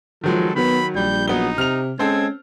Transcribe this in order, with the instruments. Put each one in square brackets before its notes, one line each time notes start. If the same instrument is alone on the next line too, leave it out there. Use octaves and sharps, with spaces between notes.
[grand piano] D#3 F#3 G#3 [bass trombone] F3 [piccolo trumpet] A4
[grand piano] D#3 F#3 [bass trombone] B3 [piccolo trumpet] B5
[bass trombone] A#1 [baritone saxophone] G3 [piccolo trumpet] G6
[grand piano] F#3 B3 G7 [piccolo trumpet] D#4
[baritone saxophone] C3 [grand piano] F6 F7
[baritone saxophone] G#3 [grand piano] C4 A4 C5 [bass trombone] C#4 [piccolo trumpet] G#6